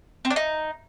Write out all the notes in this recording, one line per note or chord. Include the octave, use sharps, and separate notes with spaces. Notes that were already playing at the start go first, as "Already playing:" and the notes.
C4
D4
D#4